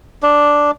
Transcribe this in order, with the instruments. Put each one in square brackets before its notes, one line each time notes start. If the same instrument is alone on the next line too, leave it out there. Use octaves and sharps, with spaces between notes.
[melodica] D4